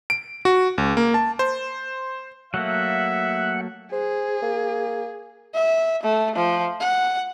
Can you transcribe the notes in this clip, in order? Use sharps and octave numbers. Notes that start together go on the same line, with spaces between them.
D7
F#4
C#2
A#3
A5
C5
F#3 A3 A#3 E5 F#5
G#4 C5
A#3
E5
A3
F3
F#5